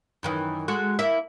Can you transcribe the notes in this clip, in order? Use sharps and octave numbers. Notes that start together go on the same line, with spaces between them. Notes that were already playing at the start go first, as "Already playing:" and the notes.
F#2 D#3 E3
G#3 F#4 A4
A#3 E4 E5